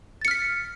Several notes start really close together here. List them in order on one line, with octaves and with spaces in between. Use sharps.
A6 C#7 F6 B6